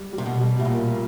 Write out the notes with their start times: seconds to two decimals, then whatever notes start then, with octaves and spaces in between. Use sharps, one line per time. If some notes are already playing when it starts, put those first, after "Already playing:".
Already playing: G3
0.13 G3
0.18 C3
0.26 B2
0.39 G3
0.60 A2
0.65 A#2 A#4
0.92 A#3